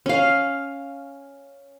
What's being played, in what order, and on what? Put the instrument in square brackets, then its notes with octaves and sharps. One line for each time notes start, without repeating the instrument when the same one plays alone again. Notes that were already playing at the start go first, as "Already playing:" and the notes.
[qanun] C#4 F5